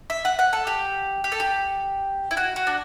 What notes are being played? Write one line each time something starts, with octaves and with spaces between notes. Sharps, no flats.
E5
F#5
F#5
A4
G4
G4
A4
G4
E4
F#4
F#4
D4